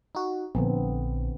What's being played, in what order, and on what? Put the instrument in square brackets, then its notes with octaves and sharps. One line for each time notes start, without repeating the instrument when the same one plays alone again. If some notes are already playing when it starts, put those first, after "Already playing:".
[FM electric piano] D#4 F#4
[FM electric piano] A#1 [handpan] D3 B3 C4